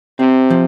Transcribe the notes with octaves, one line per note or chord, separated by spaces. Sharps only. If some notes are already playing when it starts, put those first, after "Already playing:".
C3 C4
F3